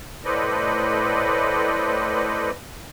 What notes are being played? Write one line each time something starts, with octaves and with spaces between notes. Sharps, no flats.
A2 A4 B4 C5 D5 D#5